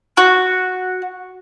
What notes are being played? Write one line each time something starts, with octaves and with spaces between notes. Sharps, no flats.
F#4